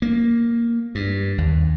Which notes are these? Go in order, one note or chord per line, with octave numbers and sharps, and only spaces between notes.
A#3
G2
D#2